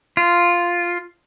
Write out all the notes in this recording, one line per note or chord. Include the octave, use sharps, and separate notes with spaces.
F4